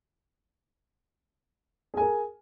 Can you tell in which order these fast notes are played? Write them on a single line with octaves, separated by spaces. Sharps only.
G#4 G#5 A#4